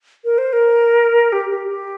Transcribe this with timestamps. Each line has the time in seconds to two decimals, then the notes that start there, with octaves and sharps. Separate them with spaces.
0.25 A#4
0.38 C5
0.53 A#4
1.33 G4
1.50 G4
1.68 G4